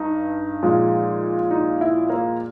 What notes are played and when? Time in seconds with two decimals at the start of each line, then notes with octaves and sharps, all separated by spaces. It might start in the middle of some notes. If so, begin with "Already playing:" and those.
Already playing: G2 D#4
0.63 A#2 F3 G#3
1.51 D#4
1.81 E4
2.10 A#3